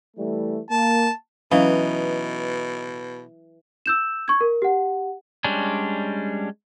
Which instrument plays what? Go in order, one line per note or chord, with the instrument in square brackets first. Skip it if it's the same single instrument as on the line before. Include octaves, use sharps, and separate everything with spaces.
[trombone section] E3 G3 A3
[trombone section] A#3 [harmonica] A5
[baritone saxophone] B2 [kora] E3 [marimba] F#3 C#4 F5 [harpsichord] D#4
[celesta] E6 G6 E7
C#6 G#6
A#4
G4 F#5
[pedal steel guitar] G3 G#3 C#4 D4